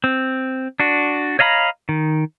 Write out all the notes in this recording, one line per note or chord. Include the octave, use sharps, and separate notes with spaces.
C4
D4 F#4
C#5 D#5 F5 A#5 B5
D#3